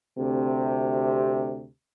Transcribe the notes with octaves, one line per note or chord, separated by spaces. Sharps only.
D2 C3